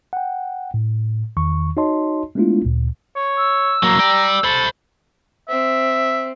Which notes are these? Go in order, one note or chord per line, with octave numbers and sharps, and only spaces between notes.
F#5 G5
A2
E2 D#3 C#6
D#4 F#4 C#5 D#5 A5 C6
G#3 A3 B3 D4 E4 F4
D2 A#2
C#5
E6
F#3 A#3 A#5
G4 D5
A4 C5 B5
C4 E5